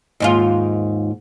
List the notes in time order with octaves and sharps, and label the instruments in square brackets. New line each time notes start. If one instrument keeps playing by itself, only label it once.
[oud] D#2 G#2 F4